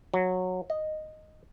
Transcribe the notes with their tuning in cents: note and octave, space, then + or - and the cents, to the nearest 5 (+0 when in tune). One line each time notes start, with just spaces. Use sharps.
F#3 -15
D#5 -5